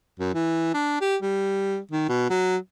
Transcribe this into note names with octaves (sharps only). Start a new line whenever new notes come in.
F#2
E3
D4
G4
G3
D#3
B2
F#3